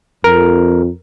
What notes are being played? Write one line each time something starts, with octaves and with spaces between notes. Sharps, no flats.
F2 A#4